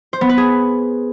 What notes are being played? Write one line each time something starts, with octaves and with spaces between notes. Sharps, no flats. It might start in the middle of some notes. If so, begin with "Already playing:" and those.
C5
B3
B4
G#4